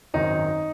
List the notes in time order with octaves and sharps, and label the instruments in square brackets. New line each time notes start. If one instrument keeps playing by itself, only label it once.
[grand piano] G#1 F#2 D#3 D#4